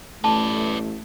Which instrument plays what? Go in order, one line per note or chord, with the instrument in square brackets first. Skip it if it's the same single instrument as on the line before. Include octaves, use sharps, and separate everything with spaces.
[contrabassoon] A1 [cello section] A3 [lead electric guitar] B4 D5 [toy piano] A5